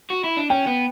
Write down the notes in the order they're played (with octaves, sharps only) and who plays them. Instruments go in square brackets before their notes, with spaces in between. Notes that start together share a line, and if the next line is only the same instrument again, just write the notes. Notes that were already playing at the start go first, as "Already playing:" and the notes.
[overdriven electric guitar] F#4
E4
D4
[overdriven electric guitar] C#4 [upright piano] G5
[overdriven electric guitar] B3